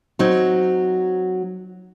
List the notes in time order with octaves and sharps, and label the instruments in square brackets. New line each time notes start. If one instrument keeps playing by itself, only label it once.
[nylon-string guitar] F#3 C4 D#4